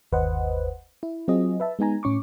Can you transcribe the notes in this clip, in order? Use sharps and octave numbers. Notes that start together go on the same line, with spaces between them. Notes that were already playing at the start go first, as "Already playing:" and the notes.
G1 D#2 B4 C5 D#5 F#5
E4
F#3 C4 F4 G#4 D#5
B4 E5 A5
G#3 B3 D#4 G#5 A#5
A2 C#4 C#6 D6